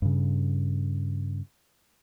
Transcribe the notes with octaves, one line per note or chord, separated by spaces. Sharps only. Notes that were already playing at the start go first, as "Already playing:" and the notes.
G2 C#3